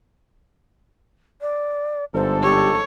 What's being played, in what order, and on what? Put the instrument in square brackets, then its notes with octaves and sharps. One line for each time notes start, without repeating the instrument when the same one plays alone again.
[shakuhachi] D5
[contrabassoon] G1 [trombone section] G#2 A4 [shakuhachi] C5
[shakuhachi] G4 [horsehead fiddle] C#5